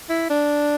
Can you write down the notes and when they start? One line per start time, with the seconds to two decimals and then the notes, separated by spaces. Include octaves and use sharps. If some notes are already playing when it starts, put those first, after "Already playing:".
0.10 E4
0.30 D4